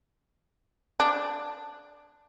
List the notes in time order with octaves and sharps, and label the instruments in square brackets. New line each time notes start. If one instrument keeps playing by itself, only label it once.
[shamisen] D4